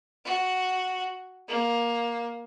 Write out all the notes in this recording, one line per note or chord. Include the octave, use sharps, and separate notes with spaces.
F#4
A#3